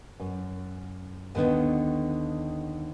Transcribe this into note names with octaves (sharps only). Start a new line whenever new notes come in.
F#2
D#2 D3 D#3 B3 D4